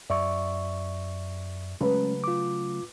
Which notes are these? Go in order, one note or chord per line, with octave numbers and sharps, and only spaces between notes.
F#2 D5 E5 C#6
C#3 F#3 G#3 A3 C#4 B4
F4 D6